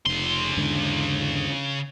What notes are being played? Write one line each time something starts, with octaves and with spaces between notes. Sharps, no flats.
F1 C#3 C6
E2 G#2 D3